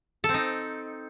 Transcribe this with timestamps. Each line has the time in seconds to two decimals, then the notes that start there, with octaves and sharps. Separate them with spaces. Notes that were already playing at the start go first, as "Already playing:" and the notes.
0.24 A4
0.29 C4
0.34 D#4